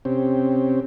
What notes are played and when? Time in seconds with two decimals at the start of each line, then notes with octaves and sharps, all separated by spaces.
0.05 C3 C4 C#4 G4